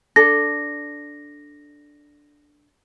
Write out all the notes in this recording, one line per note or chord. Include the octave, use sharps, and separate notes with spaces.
D4 A4 A#6